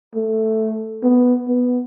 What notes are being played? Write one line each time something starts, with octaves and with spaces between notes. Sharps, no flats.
A3
B3
B3